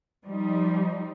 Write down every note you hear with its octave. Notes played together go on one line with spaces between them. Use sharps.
F3 G3 D#4